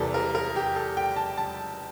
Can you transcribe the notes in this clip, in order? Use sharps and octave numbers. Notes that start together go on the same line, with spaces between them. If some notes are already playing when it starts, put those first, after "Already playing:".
Already playing: E2 C3 E3 G3 A4 A#4
A#4
A#4
G4
A4
G5
A5
A5